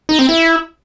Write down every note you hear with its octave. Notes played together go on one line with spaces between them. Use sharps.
D#4
C4
E4